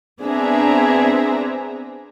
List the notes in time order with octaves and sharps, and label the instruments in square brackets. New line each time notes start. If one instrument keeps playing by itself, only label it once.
[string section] B3 C4 D4 G#4 E5 A#5